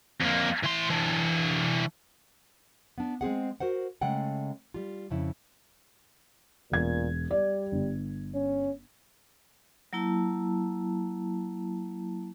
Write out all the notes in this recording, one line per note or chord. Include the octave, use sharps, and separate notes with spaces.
F2 A#3
E3 C6
E3 D4
B3 D4
G#3 C4 G#4 F#5
F#4 A#4 C5 F#5
C#3 G#3 A3 F#5 G5
G3 F4
F2 C#3 E4
E1 A#2 G#6
G3 D5
G1
C#4
F#3 A#3 E4 A5